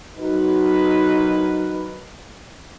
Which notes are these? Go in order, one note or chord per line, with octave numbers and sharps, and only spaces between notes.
F#3 D#4 F#4 A#4 B4